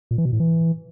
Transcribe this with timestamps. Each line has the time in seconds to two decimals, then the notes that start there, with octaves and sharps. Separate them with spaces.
0.11 A#2
0.18 E3
0.25 B2
0.33 A2
0.40 E3